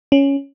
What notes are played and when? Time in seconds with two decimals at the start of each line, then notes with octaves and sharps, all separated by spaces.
0.12 C#4